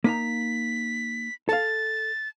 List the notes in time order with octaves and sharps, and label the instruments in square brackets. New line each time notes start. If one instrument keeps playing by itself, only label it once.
[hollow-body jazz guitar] A#3 D#4 A#5 [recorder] B6
[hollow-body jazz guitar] A4 F5 [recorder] A6